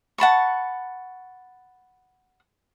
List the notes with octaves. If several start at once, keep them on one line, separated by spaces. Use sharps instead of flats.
F#5 A5 B5 C#6